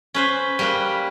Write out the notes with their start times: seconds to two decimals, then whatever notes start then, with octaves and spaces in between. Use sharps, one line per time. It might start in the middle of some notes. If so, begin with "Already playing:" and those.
0.14 C#4 B4 C5
0.59 G3 A#3 B4